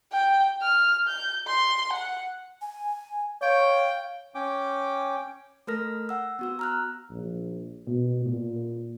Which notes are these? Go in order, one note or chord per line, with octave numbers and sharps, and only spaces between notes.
G5
F6
G6
C6
F#5
G#5
C#5 F5 G5
C#4 G5 D6
A3 A4 A#4 F6 A#6
F#5 E6
B3 F#4 E6
A#5 F6 F#6
A#1
B2
A#2